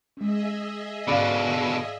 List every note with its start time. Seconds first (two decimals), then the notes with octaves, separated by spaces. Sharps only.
0.17 G#3 C#4 G#4 D#5 E5
1.08 G#2 B2 D3 C#4 D5 F5 B5